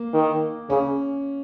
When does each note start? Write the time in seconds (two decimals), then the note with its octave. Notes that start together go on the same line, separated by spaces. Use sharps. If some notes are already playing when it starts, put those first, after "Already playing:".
Already playing: A#3
0.13 D#3
0.70 C#3 C#4